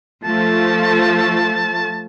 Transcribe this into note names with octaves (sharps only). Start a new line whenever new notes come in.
F3 A3 A5